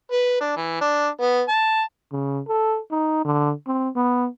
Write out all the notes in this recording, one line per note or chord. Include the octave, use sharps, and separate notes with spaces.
B4
D4
E3
D4
B3
A5
C#3
A4
D#4
D3
C4
B3